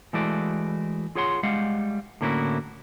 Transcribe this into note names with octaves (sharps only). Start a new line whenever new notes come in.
E3 G#3 A3 E4 F#4 D5
F4 G#4 C#5 F#5 C6
G3 G#3 F5 F#5
A2 D3 A#3 C#4 E4 F#4